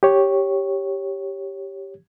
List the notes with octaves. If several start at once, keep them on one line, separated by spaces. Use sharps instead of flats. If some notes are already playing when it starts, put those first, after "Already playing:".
G4 C#5